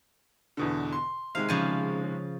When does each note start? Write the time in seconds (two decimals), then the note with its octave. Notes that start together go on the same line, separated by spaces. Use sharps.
0.57 E2 B2 D3
0.93 C6
1.35 C3 D#3 G#3 F5
1.49 C#3 F3 G#5